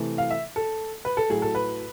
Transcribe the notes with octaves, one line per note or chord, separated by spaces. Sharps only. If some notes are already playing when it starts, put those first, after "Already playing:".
Already playing: C3 E3 A3
F5
E5
A4
B4
A4
A2 F#3 A3 G#4
A4
B4